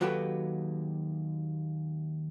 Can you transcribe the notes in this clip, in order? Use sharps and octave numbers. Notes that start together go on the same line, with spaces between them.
D#2 F#3 F#4 G4 A4 B4